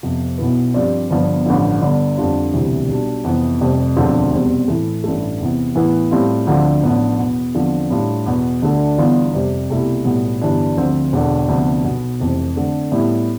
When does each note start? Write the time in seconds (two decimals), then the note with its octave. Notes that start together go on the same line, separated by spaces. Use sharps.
0.03 F2 C3 F3 B3
0.38 B1 B2 B3 E4 B4
0.74 G2 F3 C4 G4 D5
1.10 G1 G2 F3 B3
1.46 A1 G2 D3 F3
1.82 G1 G2 D3
2.18 F2 D3 G3 D4 F4
2.53 E1 D2 C3 E3 G3
2.89 B1 B2 G3 D4
3.24 F2 C3 E3 B3
3.61 F1 F2 C3 G3
3.96 E1 D2 D3 F3 C4
4.32 F1 E2 B2 G3 C4
4.68 A2 E3 A3
5.04 A1 G2 E3 A3
5.40 E2 C3 E3 B3
5.75 A2 E3 B3 E4 B4
6.11 A2 G3 C4 F4
6.47 D2 D3 F3 C4 F4
6.83 A1 A2 F3 B3 D4
7.18 E2 B2 B3
7.55 E2 D3 F3 C4 F4
7.91 A2 G3 D4 F4
8.26 E2 B2 B3
8.62 D2 D3 A3 D4
8.97 G1 G2 E3 B3 F4
9.33 F2 C3 G3
9.70 C2 B2 A3 E4 G4
10.05 B1 A2 G3 B3
10.41 G1 G2 E3 G3 D4
10.77 D2 D3 F3 C4
11.13 E1 E2 D3
11.49 D2 C3 F3 B3 D4
11.84 B1 B2 B3
12.20 F1 F2 C3 E3
12.56 D3 A3 C4
12.92 A2 G3 B3 E4